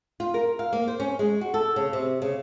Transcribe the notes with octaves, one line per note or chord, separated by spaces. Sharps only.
F4
A#4
F5
A#3
C5
C#4
G#3
F#4
A4
C#3
C3
C#3